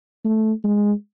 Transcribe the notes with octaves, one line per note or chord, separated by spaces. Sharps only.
A3
G#3